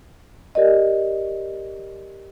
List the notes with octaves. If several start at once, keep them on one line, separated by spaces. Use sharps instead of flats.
G4 A#4 D5 D#5